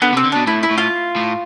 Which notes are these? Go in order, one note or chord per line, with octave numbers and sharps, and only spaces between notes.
D3 B3
C3
C4
D3
B2 D4
A2 E4
E4
A2
F4
A2